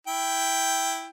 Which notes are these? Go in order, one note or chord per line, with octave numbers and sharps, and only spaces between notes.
E4 G5